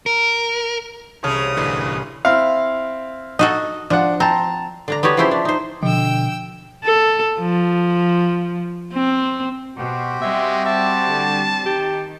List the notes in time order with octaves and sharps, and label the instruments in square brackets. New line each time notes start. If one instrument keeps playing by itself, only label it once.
[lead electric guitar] A#4
[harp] C2 [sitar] C#3 [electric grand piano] C#5 A5 F6 [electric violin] D#6
[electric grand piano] A1 D3 E3
[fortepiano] C4 E4 F5
[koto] D#4 F#4 A4 [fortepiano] D#5
[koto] F3 [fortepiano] D4 F#5
[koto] C4 [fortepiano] A5 A#5
[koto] D3 D4 A#5
B3 F#4 G4 C#5
C#3 F3 C#4 E4 G4 C5
D4
D#4 C5
[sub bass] B2 [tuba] D3 [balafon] F3 [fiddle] G5 E6
[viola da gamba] A4
F3
C4
[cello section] B2 [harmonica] F#4 G4 C5
[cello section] G3 C4 [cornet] G#3 [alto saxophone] E5
[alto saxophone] E5 [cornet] A5
[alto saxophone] D3
[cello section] D#3 [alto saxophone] G4